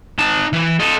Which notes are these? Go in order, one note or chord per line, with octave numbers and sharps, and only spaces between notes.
D#4 A5
E3
A4 D#5